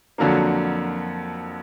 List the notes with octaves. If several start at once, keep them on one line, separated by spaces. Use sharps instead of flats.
F2 D3 F#3 A#3